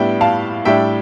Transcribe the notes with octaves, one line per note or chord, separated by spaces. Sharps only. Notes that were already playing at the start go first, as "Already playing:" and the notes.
Already playing: A2 G3 B3 D4 E5 G5
F5 A5
A2 G3 D4 E5 G5